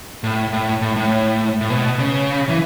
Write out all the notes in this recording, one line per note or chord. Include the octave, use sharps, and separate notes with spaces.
A2
A2
A2
A2
A2
B2
C#3
E3